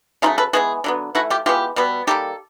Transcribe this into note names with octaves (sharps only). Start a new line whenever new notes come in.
C#3 F#3 A3 D#4 F4
A4 B4
E3 G#3 B3 F#4 G#4
D3 F#3 B3
E3 A3 E4 F#4
F4 G4
E3 G#3 B3 F4 G4
B2 G3 B3
D#3 G3 A#3 G4 A4